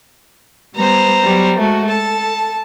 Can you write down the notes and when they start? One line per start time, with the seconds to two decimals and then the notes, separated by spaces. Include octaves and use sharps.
0.75 G3 B3 C5 A#5
1.22 F#3 G3 B3
1.59 G#3 A3 F#4
1.89 A4 A5